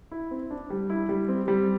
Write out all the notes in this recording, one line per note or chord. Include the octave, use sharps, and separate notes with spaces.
E4
C4
D4
G3
E4
G3
C4
G3